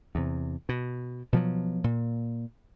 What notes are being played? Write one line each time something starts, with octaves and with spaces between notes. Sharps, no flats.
E2 C3
B2
B2 F3 F#3
A#2